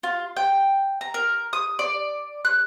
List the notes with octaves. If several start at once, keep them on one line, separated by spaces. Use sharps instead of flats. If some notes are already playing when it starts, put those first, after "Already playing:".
F4
G5
A#5
A#4
D#6
D5
F#6